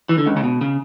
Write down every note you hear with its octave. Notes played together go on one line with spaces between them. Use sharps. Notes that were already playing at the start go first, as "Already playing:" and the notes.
E3
D3
C#2 C#3
C#3
B2
C#3